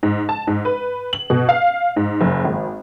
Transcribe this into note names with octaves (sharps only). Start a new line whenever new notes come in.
G#2
A5
G#2
B4
F#7
B2
F5
G#2
F#1
G#1